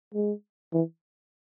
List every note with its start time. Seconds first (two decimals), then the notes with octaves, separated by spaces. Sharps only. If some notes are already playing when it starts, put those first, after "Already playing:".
0.14 G#3
0.73 E3